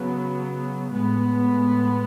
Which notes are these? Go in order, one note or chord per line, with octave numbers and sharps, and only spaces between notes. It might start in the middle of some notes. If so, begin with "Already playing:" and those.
Already playing: C#3 F#3 B3
A2 G#3 B3